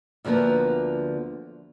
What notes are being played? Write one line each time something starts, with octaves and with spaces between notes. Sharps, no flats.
D2 D3 F3 A#3 B3